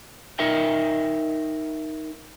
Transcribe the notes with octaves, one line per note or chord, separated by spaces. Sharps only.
D#4 A#4 E5 G5